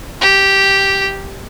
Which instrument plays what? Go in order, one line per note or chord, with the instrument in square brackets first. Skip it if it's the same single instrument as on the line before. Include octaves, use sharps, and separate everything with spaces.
[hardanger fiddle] G4